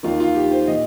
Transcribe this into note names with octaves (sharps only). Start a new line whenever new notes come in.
D#2 D#3 F4
F4
G4
C5
A#2 D#5